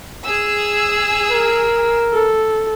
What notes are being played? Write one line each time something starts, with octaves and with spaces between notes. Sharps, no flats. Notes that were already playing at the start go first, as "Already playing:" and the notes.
G#4 E6
A#4
A4